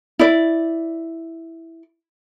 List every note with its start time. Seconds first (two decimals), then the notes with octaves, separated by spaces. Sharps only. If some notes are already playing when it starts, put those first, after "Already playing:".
0.19 E4 D5